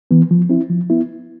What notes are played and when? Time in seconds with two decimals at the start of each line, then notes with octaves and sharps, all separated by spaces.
0.11 E3 B3
0.31 F3
0.50 C4 E4
0.70 F3
0.90 B3 E4